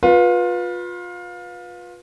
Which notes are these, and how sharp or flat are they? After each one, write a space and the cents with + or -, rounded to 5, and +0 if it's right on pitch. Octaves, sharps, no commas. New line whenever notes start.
F4 +25 B4 -15